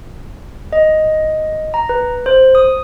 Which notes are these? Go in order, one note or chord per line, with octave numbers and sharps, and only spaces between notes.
D#5
A#5
B4
C5
D#6